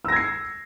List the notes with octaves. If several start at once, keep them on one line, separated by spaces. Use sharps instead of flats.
E6 G#6 A#6 C7